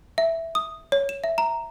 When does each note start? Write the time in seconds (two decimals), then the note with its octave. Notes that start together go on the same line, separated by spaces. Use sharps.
0.18 E5
0.55 D#6
0.92 C#5
1.09 E7
1.24 E5
1.38 A#5